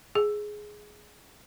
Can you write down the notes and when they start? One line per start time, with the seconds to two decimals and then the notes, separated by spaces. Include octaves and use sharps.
0.15 G#4